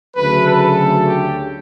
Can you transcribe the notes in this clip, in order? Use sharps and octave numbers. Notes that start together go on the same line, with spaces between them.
D2 C#3 F#3 A3 B4
A4
G4